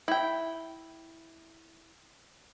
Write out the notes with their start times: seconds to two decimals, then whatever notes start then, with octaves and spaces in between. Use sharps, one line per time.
0.08 E4 G5